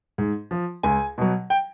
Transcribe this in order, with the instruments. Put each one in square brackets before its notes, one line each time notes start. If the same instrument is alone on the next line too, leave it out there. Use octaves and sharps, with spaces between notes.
[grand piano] G#2
F3
C#2 G#5
B2 F#3
G5